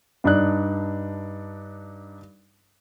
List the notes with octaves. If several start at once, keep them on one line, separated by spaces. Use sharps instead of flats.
G2 D4 D#4 D5 F#6